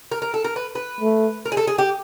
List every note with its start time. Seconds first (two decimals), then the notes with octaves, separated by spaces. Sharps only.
0.11 A#4
0.22 A#4
0.34 A4
0.44 A#4
0.56 B4
0.75 B4
1.00 A3
1.46 A#4
1.52 G#4
1.57 A4
1.67 G#4
1.78 G4